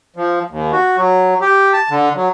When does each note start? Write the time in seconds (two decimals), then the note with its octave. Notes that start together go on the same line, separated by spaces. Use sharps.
0.16 F3
0.50 D#2
0.72 F#4
0.97 F#3
1.41 G4
1.73 A5
1.90 D3
2.16 F#3